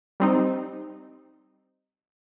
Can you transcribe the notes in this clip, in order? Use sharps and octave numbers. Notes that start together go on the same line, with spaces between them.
G3 C4 D#4